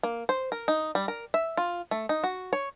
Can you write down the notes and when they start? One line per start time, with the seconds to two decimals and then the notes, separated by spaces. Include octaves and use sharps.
0.03 A#3
0.29 C5
0.52 A#4
0.68 D#4
0.95 G3
1.08 A#4
1.34 E5
1.57 F4
1.91 A3
2.09 D#4
2.24 F#4
2.53 C#5